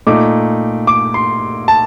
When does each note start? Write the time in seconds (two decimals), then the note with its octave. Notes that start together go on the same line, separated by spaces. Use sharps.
0.07 A#2 A3 D#4 D6
0.87 D6
1.14 C6
1.68 A5